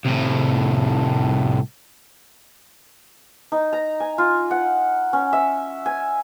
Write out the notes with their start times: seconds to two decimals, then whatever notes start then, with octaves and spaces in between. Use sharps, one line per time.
0.05 C2 A2
3.52 D#4
3.73 A#5
4.00 G#5
4.18 F4
4.51 F#5
5.13 C#4
5.33 E5
5.86 G#5